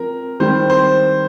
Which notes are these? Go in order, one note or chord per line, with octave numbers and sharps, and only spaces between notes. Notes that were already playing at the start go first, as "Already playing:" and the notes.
Already playing: F3 C4 A#4
D#3 G3 C4 C5
C5